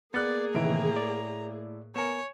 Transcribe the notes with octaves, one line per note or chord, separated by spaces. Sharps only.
A#3 B3 G#4 D5 F#6 A6 C#7
A2 C3 D#3 E3 E5 A#5 D7
D5
B3 A#4 C#5 G#5 C#7 E7